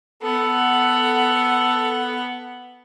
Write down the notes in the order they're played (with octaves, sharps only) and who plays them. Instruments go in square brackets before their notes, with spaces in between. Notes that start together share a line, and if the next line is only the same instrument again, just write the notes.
[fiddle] B3 F#5 [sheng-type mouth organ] A4